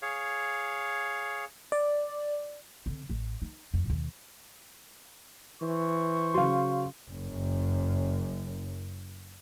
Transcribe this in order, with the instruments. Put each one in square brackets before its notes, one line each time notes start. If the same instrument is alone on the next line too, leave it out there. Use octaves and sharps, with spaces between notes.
[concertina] G#4 C#5 F5
[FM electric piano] D5
[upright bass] D3 C4
A1
D#4
F2
D#2 B2
[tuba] E3 [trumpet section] C5 C#6
[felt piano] C#3 F#3 [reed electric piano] F5 C6
[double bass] F#1 F#2